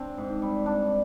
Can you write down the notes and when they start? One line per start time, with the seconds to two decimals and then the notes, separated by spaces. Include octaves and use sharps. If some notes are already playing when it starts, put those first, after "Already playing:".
Already playing: C4 D4
0.17 G#2
0.42 G3
0.66 D4